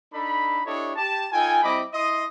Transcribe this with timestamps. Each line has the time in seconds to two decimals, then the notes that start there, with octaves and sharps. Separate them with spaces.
0.13 D4 D#4 A4 B5
0.66 D4 E4 G4 A4 C#5 D#5
0.96 G4 A5
1.32 D#4 F4 A4 G5 G#5
1.63 G3 C4 E4 D#5 B5 D6
1.93 E4 D#5 C6 D#6